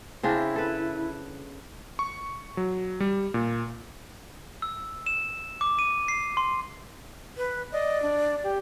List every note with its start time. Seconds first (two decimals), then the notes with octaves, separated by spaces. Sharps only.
0.23 C#3 C4 D4 E4
0.56 A4 B4
1.99 C#6
2.57 F#3
3.00 G3
3.34 A#2
4.62 E6
5.06 E7
5.61 D6
5.79 D#7
6.08 C7
6.37 C6
7.37 B4
7.72 D5 D#5
8.02 D4
8.44 G4